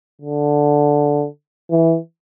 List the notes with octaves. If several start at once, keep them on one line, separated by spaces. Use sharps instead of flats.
D3
E3